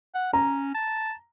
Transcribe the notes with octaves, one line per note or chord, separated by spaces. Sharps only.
F#5
C#4 A#5
A5